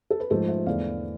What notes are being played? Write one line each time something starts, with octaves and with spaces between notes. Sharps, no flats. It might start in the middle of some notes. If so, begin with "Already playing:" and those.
A4
B4
G#2 F3 A3 A4 C5
C5 E5
E2 D3 A3 D5 F5